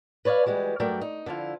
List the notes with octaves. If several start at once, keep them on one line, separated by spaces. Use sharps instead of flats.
B4 C#5 D5 E5 F5
E3 G3 G#3 F#4 G4
G2 F#3 A3 A#4 D5 G5
D#4
D3 F3 E4 F4